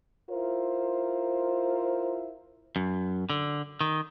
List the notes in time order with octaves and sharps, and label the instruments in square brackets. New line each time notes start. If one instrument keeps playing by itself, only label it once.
[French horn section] E4 F4 A#4 C5
[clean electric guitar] F#2
D3
D#3